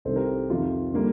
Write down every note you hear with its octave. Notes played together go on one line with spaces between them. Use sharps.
C2 C3 D#3 A4 C5
G4 A#4
F2 C3 D#3 F4
D3 G3 A#3